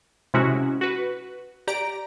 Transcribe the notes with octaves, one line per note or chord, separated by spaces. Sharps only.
C3 G#3 C#4 E4 F#4
F#4 B4
G4 D5 A#5 D7